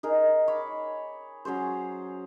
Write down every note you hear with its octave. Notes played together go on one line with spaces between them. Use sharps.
D#4 G#4 A#4
C#5 B5 D6
F#3 C#4 G#4 C5